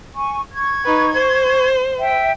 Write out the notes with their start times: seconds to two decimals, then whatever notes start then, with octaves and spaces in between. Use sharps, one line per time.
0.15 G#5 C#6
0.51 C#6 G#6
0.85 D#4 B4
1.14 C5
1.98 E5 G5